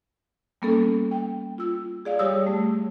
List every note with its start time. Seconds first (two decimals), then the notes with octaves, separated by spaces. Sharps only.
0.62 G3 A#3 B3 C#4 A4
1.11 G5
1.58 F4 E6
2.05 G#4 D5 F5
2.19 G3 G4 C#5 D#6 E6
2.43 G3 A3